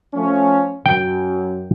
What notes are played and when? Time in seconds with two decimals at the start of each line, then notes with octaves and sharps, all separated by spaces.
0.14 F3 A3 C#4
0.86 F#2 G5